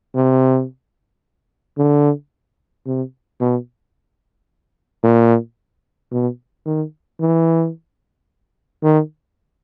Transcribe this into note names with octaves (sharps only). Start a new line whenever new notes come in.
C3
D3
C3
B2
A#2
B2
D#3
E3
D#3